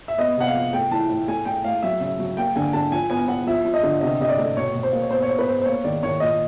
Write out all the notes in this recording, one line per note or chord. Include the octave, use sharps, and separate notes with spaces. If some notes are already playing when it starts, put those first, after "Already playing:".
E5
B3 D#5
C3 F#5
F5
F3
A3 G5
E3 A5
A2
A3 G#5
A3 G5
A2 F5
F#3 E5
C#3 E5
F#3
A#3 G5
D3 G#5
D3 A5
F3 G#5
B3 G#5
B3 F#5
F3 E5
F3
D#5
D3
C3 D#5
C3 D#5
D5
A3
B2 C#5
B2
C5
A#3
C#5
B3 C5
C#5
B3 C5
B4
B3 C5
C5
A#3 C#5
D#3 D5
D#3 C#5
A#2 D#5